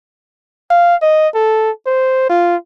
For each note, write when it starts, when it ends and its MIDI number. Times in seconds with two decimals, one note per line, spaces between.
0.70 0.95 77
1.02 1.28 75
1.34 1.70 69
1.86 2.26 72
2.29 2.56 65